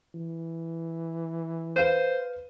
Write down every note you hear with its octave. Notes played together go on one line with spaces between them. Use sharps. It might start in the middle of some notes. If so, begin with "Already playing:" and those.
E3
B4 C5 F5 D#7